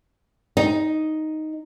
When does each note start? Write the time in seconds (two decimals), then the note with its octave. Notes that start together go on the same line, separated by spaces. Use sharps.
0.57 D#4